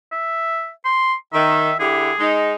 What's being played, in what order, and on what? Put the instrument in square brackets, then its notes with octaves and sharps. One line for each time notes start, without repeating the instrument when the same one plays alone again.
[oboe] E5
C6
[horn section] D#3 [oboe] E5
[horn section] D3 E4 G4 [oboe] G#4
[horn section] G#3 D#4